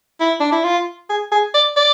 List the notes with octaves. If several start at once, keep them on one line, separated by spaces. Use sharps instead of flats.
E4
D4
E4
F4
G#4
G#4
D5
D5